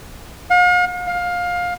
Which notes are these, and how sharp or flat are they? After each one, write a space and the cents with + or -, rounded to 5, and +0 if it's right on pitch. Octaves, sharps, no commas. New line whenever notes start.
F5 +45
F5 +20